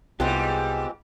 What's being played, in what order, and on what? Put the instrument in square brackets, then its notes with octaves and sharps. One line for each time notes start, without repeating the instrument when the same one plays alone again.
[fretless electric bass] C2 [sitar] G#2 G3 [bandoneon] G#3 C4 [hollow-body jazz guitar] B3 F4 G4